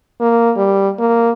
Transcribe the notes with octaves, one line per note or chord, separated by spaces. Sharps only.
A#3
G3
A#3